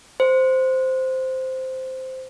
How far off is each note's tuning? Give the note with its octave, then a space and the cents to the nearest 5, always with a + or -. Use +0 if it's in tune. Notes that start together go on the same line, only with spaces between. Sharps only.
C5 -5